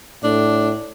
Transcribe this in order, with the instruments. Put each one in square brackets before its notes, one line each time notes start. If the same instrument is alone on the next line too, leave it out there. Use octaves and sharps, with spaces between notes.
[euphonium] A2 [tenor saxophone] D4